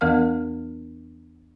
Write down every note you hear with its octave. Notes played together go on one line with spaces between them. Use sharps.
E2 E3 B3 A#4 F5 F6